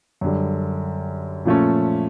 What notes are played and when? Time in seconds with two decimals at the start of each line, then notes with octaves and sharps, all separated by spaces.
0.21 F#2 D3 G3
1.45 A#2 F3 A3 C#4